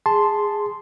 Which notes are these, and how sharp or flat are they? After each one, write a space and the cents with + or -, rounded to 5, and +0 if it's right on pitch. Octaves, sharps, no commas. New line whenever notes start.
G#4 -10 A5 +0 C6 +0